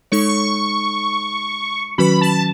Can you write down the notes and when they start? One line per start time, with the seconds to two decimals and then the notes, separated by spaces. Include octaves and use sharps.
0.12 G#3 D#4 A4 C#5 C#6
1.98 D#3 F#3 C#4 F#4 B4 B5
2.21 A5